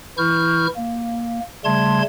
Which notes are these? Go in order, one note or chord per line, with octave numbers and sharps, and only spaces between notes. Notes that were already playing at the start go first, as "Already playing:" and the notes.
E3 E4 C#6 F6 G6
A#3
C#3 G3 A3 A5 C6 G#6